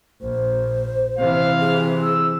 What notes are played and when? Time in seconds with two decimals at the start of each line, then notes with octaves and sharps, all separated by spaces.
0.21 A#1 C5
1.18 C3 E3 F5
1.59 G#4
2.02 E6